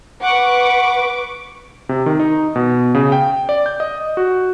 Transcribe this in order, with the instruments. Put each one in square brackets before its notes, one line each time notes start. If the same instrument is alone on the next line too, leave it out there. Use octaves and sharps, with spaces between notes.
[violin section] B4 C#6 D6 [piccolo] F#5
[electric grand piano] C3
D#3
D#4
B2
C#3
G5
D5
G6
D#5
F#4